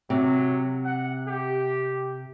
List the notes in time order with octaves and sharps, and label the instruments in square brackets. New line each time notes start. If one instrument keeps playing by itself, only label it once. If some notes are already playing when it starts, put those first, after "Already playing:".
[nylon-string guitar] C3 [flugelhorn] F#3
[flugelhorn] F#5
G4